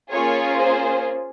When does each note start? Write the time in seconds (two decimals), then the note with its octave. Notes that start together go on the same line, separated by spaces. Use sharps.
0.10 A#3 C#4 F4 G#4 C#5
0.57 C5